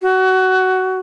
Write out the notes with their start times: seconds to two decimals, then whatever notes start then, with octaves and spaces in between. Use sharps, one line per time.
0.02 F#4